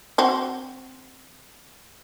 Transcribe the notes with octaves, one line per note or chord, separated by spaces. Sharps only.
C4 F#4 C5